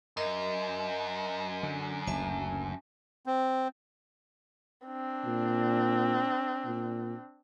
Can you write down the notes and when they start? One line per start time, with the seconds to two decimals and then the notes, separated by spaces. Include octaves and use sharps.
0.17 F#2 A#4 D#5 E5
1.63 D3
2.07 F#1 D2 E5 G#5 A5
3.26 C4
4.87 C4 D4
5.26 A#2
6.65 A#2